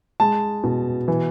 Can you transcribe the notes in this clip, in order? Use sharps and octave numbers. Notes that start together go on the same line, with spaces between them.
G#3 A5
B2
E3